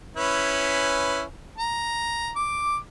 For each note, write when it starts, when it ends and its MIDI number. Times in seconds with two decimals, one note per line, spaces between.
0.17 1.23 61
0.17 1.23 64
0.17 1.23 71
1.58 2.31 82
2.36 2.77 86